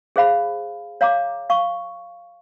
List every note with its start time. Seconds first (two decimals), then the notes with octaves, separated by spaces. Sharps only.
0.16 G#4 C5 F5 B5
1.01 C#5 F5 A#5 D6
1.50 F5 C#6